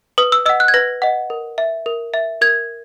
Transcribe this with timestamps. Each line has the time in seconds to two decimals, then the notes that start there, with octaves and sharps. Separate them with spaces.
0.18 B4 D#6
0.32 E6
0.46 D#5 F#5 E6
0.60 F#6
0.68 G#6
0.74 B4 A#6
1.02 D#5 F#5
1.30 A#4
1.58 E5
1.86 A#4
2.14 E5
2.41 A#4 G#6